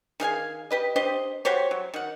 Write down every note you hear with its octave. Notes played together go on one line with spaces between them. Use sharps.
D#3 G#4 F5 G#5
G4 B4 D#5
D4 G4 C5 D#5
F#4 G4 C5 C#5
F#3
D#3 F#5